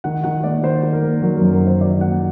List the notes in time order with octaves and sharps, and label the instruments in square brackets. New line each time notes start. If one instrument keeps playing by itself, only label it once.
[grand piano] D#3 F#5
D#3 F#5
A#3 D5
D#3 C5
D#3
A#4
A#3
F#3 A#4
F#2 A#4
A#4
D#3
C5
D#3 D5
A#3 F#5